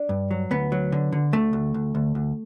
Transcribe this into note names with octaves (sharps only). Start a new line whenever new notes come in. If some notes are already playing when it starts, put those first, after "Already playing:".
Already playing: D4
G2
F#3
D2 B3
F#3
D3
D3
D2 A3
D2
D2
D2
D2